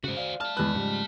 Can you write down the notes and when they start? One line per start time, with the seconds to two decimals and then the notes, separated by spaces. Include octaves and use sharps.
0.04 G#2 C#3 F#4 C5
0.17 D5 F5
0.40 A3 A5 F6
0.57 E2 G#3 B4 F#6
0.75 G#2 C#3 F3 G3